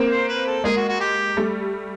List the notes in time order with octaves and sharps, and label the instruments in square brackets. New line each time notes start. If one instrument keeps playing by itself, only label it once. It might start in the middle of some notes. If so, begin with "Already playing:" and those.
Already playing: [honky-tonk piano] A#3 C4
[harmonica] C5
B4
A4
[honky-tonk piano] G#3 A#3 [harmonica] G#4
[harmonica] F#4
F#4
G4
[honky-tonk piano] G3 A3